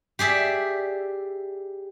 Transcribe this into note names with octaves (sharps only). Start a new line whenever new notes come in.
G4 G#4 D5 E5